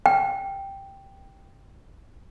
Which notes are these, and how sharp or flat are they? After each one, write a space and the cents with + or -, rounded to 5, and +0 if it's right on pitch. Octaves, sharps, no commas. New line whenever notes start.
G5 +0